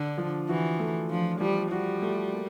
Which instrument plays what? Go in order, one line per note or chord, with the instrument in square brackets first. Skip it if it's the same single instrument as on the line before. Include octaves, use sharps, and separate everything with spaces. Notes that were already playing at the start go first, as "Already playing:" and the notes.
Already playing: [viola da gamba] D3 [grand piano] D4
[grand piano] F3
[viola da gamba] E3 [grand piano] F#4
[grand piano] A3
[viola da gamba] F3 [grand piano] D4
[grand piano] F3 [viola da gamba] G3
[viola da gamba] G3 [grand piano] F#4
[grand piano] A3
A#3